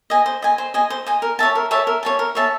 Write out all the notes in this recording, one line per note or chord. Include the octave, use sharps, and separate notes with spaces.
D#5 G#5
C5
D#5 G#5
C5
D#5 G#5
C5
D#5 G#5
A#4
C#5 E5 A5
A#4
C#5 E5 A5
A#4
C#5 E5 A5
A#4
C#5 E5 A5